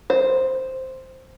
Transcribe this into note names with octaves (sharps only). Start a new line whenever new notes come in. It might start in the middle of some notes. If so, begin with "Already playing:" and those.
C5